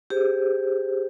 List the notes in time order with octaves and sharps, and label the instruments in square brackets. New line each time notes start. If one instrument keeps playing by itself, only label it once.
[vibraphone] G4 G#4 C5